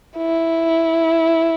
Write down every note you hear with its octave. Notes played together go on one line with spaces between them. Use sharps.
E4